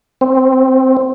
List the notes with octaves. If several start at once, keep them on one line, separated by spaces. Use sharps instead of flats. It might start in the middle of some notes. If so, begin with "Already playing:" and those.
C4